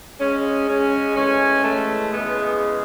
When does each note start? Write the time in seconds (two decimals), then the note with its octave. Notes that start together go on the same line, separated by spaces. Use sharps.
0.19 C#3 G#3 C#4
0.67 C#4
1.15 A2 E3 G#3 C#4
1.63 A3
2.12 C#3 E3 G#3 B3